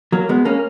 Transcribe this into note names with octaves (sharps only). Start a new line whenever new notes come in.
F#3 A#3
G#3 B3
A#3 C#4